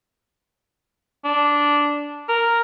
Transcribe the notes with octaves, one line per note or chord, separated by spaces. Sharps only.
D4
A#4